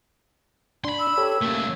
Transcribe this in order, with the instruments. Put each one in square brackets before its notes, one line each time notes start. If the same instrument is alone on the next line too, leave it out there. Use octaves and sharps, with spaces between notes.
[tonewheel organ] D4 [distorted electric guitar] B5 C6
[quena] E6
[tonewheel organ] G4 A4 C#5
[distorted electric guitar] C#3 A3 [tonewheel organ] A#3
[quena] E6